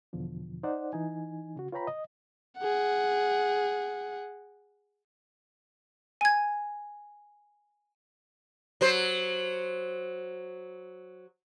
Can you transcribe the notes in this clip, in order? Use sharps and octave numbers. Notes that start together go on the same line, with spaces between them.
E2 B2 D3 F3
D#4 C5 D5 F#5
E3 D#4 G#5
C#3 F#4
F4 B4 C#5 G5 A#5 B5
D#5
G#4 F#5
G#5 G#6
F#3 C5